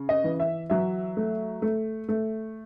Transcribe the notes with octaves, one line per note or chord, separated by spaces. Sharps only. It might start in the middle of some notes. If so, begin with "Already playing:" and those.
Already playing: C#3
D#5
E3
E5
F#3 E5
A3
A3
A3